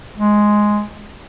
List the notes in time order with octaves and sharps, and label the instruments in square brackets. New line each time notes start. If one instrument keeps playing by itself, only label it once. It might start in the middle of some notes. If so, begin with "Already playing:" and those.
[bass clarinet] G#3